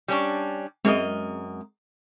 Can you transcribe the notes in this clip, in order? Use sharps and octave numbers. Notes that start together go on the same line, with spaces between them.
G3 C#4 D4
F#2 G#3 C4 A#4 D#5